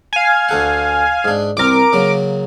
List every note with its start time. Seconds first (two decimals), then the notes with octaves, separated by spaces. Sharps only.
0.13 F5 G#5
0.49 D2 A4 F#5
1.25 G#2 D4
1.57 C2 C4 A#4 D6
1.93 C#3 F#3 A#3